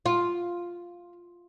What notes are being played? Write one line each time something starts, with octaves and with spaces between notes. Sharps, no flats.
F4